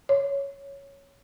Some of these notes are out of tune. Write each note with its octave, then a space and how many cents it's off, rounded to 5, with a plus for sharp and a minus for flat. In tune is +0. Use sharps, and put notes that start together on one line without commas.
C#5 +5